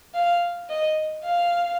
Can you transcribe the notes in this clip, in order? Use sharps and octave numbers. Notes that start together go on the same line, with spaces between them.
F5
D#5
F5